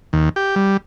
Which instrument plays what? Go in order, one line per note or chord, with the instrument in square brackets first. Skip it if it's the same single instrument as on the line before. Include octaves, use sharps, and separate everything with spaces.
[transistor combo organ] D#2
G4
G3